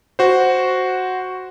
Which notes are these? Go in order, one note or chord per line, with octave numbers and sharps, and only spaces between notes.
F#4 C5